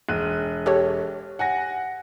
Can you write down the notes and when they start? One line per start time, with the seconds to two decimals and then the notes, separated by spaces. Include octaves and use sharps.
0.09 E1 F#6 D#7
0.66 G4 A4 C#5
1.39 F#5 G#5 A#6